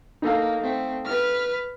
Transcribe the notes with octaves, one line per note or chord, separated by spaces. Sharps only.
A#3 D#4 A4 F5
A3 C4
B4 F6